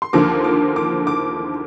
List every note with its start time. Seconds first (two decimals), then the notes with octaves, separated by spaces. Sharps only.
0.02 C6
0.13 D#2 D3 F3 A#3 D6
0.44 D6
0.76 D6
1.07 D6